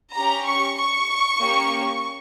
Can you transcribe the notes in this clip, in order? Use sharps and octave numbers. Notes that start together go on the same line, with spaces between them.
C#4 G4 A#5
C#6
C#6
A#3 C#4 G4